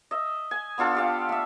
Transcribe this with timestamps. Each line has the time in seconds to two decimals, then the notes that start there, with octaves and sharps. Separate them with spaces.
0.11 D#5 E5
0.51 G#5
0.78 B3 D4 F4 A4
0.95 F4 G4 F5
1.29 A3 E5